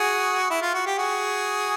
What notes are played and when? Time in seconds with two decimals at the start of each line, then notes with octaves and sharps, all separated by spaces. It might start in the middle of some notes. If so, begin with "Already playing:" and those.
Already playing: F#4 G#4
0.50 E4
0.62 F4
0.74 F#4
0.86 G4
0.98 F#4 G#4